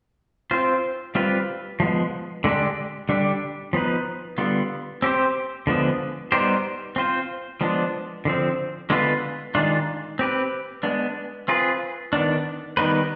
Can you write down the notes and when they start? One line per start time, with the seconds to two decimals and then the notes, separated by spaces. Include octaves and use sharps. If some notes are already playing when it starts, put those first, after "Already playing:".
0.51 C4 F4 C5
1.15 G3 C4 F4 B4
1.80 F3 G#3 B3
2.44 D3 G#3 D4 G4
3.09 D3 G3 D4 G4
3.73 F3 B3 D#4 B4
4.38 D3 G3 B3 F4
5.02 C4 G4 C5
5.67 D3 F3 G#3 B3
6.32 G3 B3 D#4 G4 C5
6.96 C4 F4 C5
7.61 F3 G#3 B3 D4
8.25 D3 F3 C4
8.90 D3 G#3 B3 F4 B4
9.55 D#3 G#3 D4 F4
10.19 C4 G4 B4
10.83 G#3 B3 D4
11.48 C4 F4 G#4 B4
12.13 D#3 B3 D4
12.77 D#3 G3 B3 D#4 B4